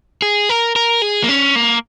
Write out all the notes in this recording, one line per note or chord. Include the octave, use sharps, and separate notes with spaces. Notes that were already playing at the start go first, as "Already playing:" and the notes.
G#4
A#4
A#4
G#4
A#3
C#4
A#3